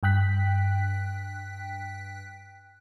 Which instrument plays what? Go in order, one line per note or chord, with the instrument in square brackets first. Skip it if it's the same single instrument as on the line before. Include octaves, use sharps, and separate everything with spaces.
[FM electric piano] G2 G5 F#6 B6